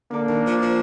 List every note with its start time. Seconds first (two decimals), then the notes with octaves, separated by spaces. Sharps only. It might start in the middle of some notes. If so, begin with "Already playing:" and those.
0.12 D3 A#3 D4
0.29 D#3
0.46 F3
0.62 F3